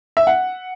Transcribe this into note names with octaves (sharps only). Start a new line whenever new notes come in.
E5
F#5